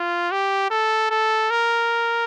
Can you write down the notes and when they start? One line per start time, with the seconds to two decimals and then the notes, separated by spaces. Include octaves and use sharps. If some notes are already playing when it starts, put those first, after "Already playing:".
Already playing: F4
0.31 G4
0.70 A4
1.10 A4
1.51 A#4